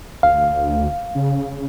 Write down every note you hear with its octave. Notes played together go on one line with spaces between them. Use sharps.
D2 F5
C#3